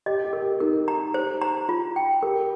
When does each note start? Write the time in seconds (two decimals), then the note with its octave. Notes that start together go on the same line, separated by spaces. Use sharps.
0.06 G4 D#5
0.24 G4
0.33 A#4
0.42 G4
0.60 D#4 A#4
0.88 A#5
1.14 G4 C5
1.42 A#5
1.69 F4
1.96 G5
2.23 G4 A#4